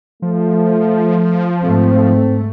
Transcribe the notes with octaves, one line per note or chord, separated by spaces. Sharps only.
F3 A3
G#2 A3 C4